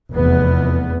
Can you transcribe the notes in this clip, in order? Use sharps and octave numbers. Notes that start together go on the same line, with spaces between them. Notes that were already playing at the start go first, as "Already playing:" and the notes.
F1 E2 B3